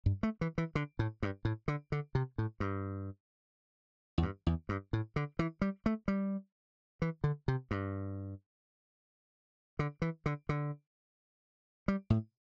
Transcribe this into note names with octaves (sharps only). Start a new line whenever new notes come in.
G2
A3
E3
E3
D3
A2
G2
A2
D3
D3
C3
A2
G2
E2
G2
E2
G2
A2
D3
E3
G3
A3
G3
E3
D3
C3
G2
D3
E3
D3
D3
G3
A2